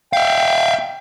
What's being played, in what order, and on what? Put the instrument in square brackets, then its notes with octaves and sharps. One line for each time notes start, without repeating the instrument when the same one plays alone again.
[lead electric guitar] E5 F5 [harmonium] G5